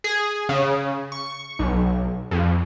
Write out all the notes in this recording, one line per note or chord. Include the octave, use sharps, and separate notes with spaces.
G#4
C#3
C#6
B1
F2